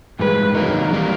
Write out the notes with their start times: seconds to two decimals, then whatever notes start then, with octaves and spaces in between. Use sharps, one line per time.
0.19 G2 E3 G#3 B4
0.55 C3 D#3 F#3 A#3 D#4 A#4
0.91 E3 G3 A#3